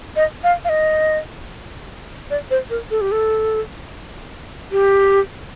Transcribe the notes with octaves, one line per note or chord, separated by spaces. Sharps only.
D#5
F5
F5
D#5
D5
C5
A#4
A4
G4
A4
G4